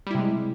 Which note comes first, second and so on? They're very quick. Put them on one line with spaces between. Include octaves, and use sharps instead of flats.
G3 E4 C3 G#3